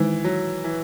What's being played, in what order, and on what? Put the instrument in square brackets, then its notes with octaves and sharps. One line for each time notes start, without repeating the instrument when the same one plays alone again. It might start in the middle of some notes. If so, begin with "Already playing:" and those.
Already playing: [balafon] D#3 G#3 D#4 [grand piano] E3
[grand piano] F#3
E3